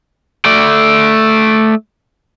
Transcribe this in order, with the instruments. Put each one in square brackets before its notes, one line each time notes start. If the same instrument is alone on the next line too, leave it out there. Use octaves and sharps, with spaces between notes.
[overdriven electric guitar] A3 D5